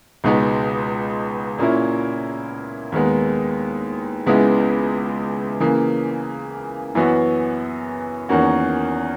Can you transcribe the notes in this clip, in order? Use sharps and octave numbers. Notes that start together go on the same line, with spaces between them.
C#2 B2 G#3 B3 D#4
A#2 A#3 C#4 E4
D#2 D#3 G#3 B3
C#2 C#3 G#3 B3 E4
C#3 E3 A#3
F#2 E3 B3 F#4
E2 D#3 A#3 C#4 F#4